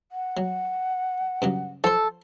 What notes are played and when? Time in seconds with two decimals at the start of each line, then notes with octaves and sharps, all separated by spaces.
0.12 F#5
0.37 F#3
1.42 G2 C#3 F#3
1.84 F3 A4 C5